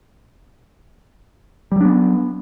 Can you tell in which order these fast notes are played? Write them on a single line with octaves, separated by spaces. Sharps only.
G3 F#3 D4 B3